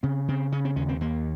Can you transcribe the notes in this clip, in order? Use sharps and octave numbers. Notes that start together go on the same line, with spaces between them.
C#3 C4
C#3 C4
C#3 C#4
C4
D#2 C#4
C4
D#2 A#3